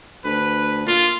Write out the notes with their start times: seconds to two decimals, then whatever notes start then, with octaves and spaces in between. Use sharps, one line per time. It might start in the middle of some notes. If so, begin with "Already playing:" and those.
0.24 D2 B4
0.87 A#2 F4